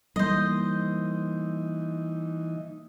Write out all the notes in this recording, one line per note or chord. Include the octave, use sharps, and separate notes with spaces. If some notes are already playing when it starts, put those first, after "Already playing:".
E3 G3 A3 A#3 D#4 C5 D#5